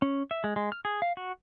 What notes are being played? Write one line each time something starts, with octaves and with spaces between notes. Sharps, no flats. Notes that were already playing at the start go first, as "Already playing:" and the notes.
C#4
E5
G#3
G#3
F6
G#4
F5
F#4